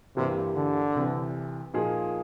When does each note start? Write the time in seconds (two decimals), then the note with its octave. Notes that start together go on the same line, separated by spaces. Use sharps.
0.17 G2 C3 E3 G3 A#3
0.56 D3
0.95 C2 C3 E3
1.74 A#2 F3 A#3 D#4 G#4